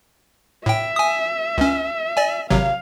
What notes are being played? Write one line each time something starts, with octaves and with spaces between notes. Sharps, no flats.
A2 E5 G5
G#5 D#6
C#2 C#4
D5 G#5
G#1 C3 F#3 F5